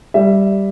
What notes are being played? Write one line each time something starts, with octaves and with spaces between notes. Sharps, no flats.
G3 E5